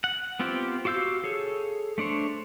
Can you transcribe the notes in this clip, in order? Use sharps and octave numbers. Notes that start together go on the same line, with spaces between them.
F#5
B3 C4 F4 G4 C5
F#4 G4 F5 E6 G6
G#4 A4 C#5
A3 D4 C5 C#5